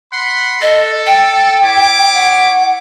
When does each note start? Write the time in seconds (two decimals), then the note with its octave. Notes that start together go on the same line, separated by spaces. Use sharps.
0.13 F#5 B5 C6
0.62 A4 D#5
1.06 G5
1.63 E4 C#5 D6
2.15 F#5